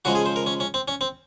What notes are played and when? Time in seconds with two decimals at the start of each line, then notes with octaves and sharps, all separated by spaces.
0.05 C#3 F3 G#3 F#4
0.15 G#4
0.26 C5
0.36 A#4
0.46 C#4
0.60 C#4
0.74 C4
0.88 C#4
1.01 C4